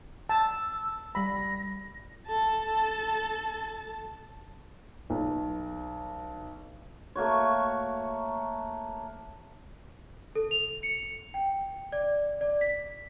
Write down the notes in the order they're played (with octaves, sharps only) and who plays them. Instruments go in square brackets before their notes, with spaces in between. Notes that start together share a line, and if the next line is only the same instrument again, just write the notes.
[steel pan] A5 [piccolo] E6
[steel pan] G3 B5 [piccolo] A#6
[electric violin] A4 A5
[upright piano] B1
[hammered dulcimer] A3 A#3 F#4 C#5
[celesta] A4
F7
C#7
G5
D5
D5
B6